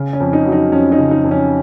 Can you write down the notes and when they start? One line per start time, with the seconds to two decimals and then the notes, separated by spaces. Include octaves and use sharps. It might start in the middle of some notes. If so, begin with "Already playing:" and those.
Already playing: C#3
0.13 C#4
0.20 F2
0.33 D#4
0.46 F#3
0.52 D#4
0.72 F2 C#4
0.92 D#4
0.99 C#3
1.11 D#4
1.24 F2
1.31 C#4